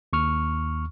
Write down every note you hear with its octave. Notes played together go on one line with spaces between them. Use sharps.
D#2 C#6 F6